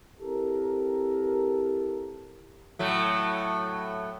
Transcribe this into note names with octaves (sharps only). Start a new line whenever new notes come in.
C4 E4 G4 A4 A#4
A2 F#3 A3